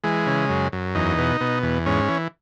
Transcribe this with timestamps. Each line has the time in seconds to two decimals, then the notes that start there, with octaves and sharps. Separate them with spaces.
0.04 E3 G#3
0.27 C#3
0.49 F#2
0.72 F#2
0.95 E2 D#4
1.18 B2
1.41 B2
1.63 E2
1.86 G#2 C#4
2.08 E3